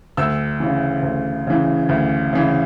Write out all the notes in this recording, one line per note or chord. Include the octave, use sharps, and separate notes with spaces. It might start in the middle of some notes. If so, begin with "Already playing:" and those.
D2 E6
C#3 E3
D2
C#3 E3
D2
C#3 E3